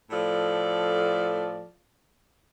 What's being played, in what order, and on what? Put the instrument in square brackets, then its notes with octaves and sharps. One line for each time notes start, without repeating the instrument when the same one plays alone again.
[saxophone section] A2 F3 A4 D5